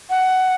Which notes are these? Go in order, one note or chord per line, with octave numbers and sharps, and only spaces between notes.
F#5